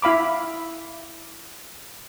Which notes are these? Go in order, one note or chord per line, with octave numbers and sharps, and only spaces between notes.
E4 F5 B5 D6